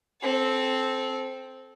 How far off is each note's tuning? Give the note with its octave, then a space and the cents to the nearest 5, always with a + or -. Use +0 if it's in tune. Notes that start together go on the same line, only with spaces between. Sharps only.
C4 +0 A4 -20